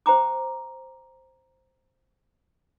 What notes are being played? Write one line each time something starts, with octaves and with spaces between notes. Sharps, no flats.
C5 G5 A#5 D6